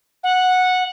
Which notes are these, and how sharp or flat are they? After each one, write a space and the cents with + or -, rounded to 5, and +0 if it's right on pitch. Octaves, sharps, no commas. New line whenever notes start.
F#5 -10